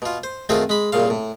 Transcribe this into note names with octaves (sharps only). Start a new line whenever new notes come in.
B2 F4
C5
D#3 A3 C4 F4 F#4 G#4
G#3 B5
C2 A#2 C#3 F5
A2